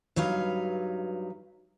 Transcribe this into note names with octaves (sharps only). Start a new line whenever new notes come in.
G2 F#3 D#4 B4 F5